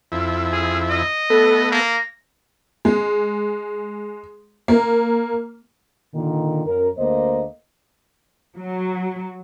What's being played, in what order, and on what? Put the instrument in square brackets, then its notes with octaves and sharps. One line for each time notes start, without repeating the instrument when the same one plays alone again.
[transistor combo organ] F2 E4
[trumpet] G#4
D#5
[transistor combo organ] A3 B3 [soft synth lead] A4
[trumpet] A#3 [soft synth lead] A#6
[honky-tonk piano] G#3
A#3
[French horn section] A#2 D3 D#3
F#2 A#4
D2 A#3 C5 D#5
[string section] F#3